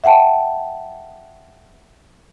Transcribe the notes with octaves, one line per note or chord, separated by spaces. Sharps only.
E5 F#5 G5 A5